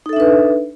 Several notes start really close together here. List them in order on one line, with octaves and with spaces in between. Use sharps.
D#4 A4 E5 D4 B4